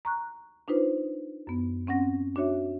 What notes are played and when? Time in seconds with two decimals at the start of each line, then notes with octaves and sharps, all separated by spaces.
0.05 A#5 C#6 F#6
0.68 D4 D#4 F4 B4 C5
1.47 F#2 B3
1.87 C4 C#4 F#5 A#6
2.36 D4 F#4 C#5 E5